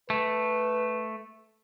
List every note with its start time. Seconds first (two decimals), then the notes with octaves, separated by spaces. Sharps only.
0.10 A3 B4